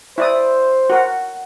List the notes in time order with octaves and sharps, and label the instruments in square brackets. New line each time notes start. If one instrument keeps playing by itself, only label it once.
[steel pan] E4 D5 D#6 [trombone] C5
[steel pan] F#4 A#4 F#5